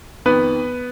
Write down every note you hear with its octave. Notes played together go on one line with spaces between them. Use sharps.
F2 D#3 B3 B4